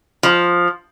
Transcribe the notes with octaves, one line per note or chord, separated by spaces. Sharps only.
F3